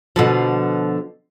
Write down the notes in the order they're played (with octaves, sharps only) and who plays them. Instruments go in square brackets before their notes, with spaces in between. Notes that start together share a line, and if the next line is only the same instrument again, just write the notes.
[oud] B2 D3 F3